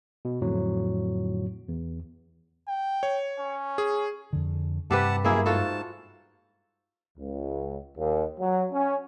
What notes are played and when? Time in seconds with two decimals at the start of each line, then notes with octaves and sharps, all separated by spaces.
0.25 B2
0.41 F2 A2 D3 F#3
1.69 E2
2.68 G5
3.03 C#5
3.40 C#4
3.78 G#4
4.33 F2 D3
4.91 G2 C3 G4 B4 F#5 A5
5.24 F#2 A#3 E4 G#4
5.46 G#2 F4 F#4 A4 A5
7.18 C#2
7.98 D#2
8.40 F#3
8.73 C#4